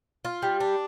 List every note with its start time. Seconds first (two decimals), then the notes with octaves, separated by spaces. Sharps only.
0.25 F4
0.42 G3
0.60 D4